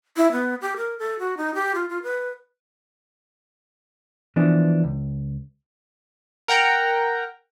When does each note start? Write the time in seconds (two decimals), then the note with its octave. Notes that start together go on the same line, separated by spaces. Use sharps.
0.17 E4
0.32 B3
0.61 G4
0.77 A#4
0.99 A4
1.19 F#4
1.37 D#4
1.55 G4
1.75 F4
1.89 F4
2.03 B4
4.36 E3 F3 B3 D4
4.84 C#2
6.48 A#4 F#5 G5 A#5